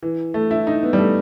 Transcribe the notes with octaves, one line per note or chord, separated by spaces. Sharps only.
E3
A3
E4
D#4
B3
G3
A3